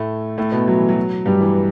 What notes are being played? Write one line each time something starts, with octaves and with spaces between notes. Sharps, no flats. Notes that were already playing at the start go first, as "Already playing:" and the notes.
Already playing: A2 A3
A2 A3
B2 B3
F#3
E3
F#3
G2 G3
E3